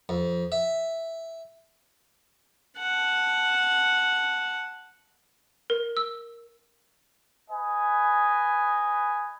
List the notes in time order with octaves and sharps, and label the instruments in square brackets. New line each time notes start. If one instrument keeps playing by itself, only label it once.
[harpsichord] F2
E5
[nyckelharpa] F#5 A5
[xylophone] A#4
E6
[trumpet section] B4 D#5 G#5